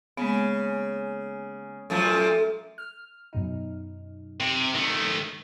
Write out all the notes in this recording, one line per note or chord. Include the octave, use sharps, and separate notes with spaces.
C#3 G#3 A#3 B3
F#2 A#2 F3 A3
F6
F#2 B2 D#4
C3
D#3 A3